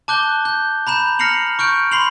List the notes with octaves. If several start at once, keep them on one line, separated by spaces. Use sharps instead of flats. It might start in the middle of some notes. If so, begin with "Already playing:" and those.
A5 D6 F#6 G6 G7
G6
A#5 B5 G6 E7
F6 A#6 C7 C#7 F7 F#7
C#6 F6 G6 D7
B5 C6 C7 F7 F#7